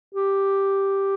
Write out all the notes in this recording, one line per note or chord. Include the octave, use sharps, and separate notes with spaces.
G4